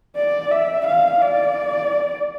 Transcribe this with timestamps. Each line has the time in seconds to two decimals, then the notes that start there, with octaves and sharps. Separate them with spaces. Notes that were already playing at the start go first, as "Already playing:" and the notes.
0.16 D5
0.51 E5
0.87 F5
1.22 D5